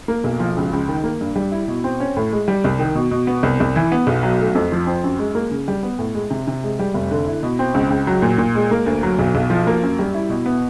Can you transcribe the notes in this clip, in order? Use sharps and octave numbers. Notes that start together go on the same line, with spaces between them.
A#3
B1
F3
C#2
C#2
D#3
A#3
G2
G3
E4
B2
C4
C#4
A2
G#3
G3
C2
D#3
B2
B2
B3
C2
C2
E3
B3
B1
F#3
A3
F2
F3
C4
F#2
G#3
A#3
C#3
G3
B3
A2
G#3
C3
C3
G#3
G3
F1
D3
E4
B2
C4
C#2
C#2
F#3
A#2
A#2
G#3
A#3
D2
F#3
B1
B1
F3
A#3
F#2
G3
E4
B2
B3